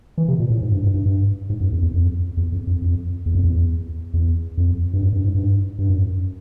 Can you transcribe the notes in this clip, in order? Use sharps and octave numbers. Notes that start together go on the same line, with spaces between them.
E3
C3
A#2
A2
G#2
G2
G2
G2
G2
G#2
F#2
E2
E2
F2
E2
F2
F2
F2
E2
F2
E2
E2
F2
G2
F#2
G2
G#2
G2
G2
F#2